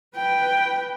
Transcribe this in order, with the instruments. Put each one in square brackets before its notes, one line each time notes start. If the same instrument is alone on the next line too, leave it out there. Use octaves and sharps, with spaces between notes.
[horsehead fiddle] B4 G5